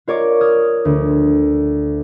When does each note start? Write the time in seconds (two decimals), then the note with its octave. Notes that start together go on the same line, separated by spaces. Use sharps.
0.08 F4 A#4 C#5 D5 C#6 D6
0.41 D#6 F6 G#6
0.85 D2